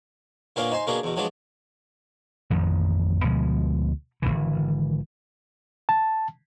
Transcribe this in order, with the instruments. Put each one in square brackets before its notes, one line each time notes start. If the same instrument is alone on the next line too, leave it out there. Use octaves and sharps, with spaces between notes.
[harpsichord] A#2 A#3 B3 C#4 D4 F5
D#4 C5 G#5 C6
B2 A#3 C#4 D4 G#4
E2 B2
F3 F#3 G#3 B3 D4
[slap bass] A1 F2 D#3 F3
D2 B2 F3 G#3
G#1 D2 D3 E3
[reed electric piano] A5